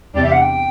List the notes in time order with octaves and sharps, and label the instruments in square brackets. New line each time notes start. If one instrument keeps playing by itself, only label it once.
[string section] E2 C3 G3 D4 G4 [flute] D5
[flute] E5
F#5
G5